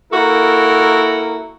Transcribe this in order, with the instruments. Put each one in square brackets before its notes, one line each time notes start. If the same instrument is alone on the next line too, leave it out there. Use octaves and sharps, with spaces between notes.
[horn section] A#3 E4 F#4 A4 A#4